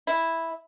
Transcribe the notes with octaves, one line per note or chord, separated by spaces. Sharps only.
E4